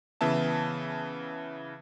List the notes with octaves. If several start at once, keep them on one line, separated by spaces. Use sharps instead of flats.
C#3 E3 B3 E5 A5